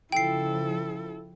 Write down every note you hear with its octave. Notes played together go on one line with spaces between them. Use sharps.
C#3 F3 E4 A4 G5 C7